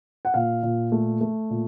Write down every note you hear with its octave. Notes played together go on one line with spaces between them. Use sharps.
F#5
A#2 F5
A#2
A3
A3
A#2